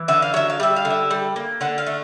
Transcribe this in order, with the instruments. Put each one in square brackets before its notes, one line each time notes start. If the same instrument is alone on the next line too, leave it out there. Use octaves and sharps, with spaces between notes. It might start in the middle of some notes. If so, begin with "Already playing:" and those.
Already playing: [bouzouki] E3
D3 E5
F5
F#3 E5
F5
G3 E5
F5
D3
E5
G3
A#3
D3 F#5
F5
A3